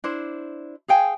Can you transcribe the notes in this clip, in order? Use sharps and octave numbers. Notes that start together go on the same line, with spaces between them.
D4 E4 C5
G#4 F5 G5 G#5